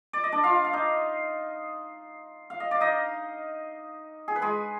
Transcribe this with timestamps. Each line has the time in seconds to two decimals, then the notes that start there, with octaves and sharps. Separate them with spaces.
0.13 D5
0.23 D#5
0.32 D4 D5
0.44 F4 F5
0.64 F5
0.73 D#4 D#5
2.50 F5
2.60 D#5
2.71 D5
2.81 D#4 D#5
4.28 G#4
4.36 B4
4.42 G#3 G#4